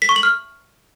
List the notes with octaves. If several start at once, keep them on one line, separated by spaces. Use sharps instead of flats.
B6
C#6
F#7
F6